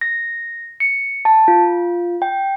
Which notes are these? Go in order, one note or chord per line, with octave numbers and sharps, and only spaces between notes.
A#6
C#7
A5
F4
G5